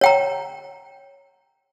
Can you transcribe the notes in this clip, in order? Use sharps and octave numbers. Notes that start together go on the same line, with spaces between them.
C#5 G5 A#5